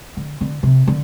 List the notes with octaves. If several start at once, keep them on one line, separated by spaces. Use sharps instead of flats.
D3
D3
C3
D3